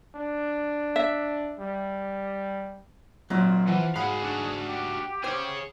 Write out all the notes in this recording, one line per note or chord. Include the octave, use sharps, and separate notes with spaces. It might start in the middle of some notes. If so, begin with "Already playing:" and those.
D4
E5
G3
G#1 A#2 F#3
E3 F3 F#5
G#2 F#4 G#4 F5 F#5 B5
D4 F#4
G4
G#4 C5 C#5